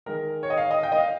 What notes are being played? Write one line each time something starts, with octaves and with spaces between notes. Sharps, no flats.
D#3 G#3 A#4
C#5
D#5
F5
D#5
G5
D#5
F5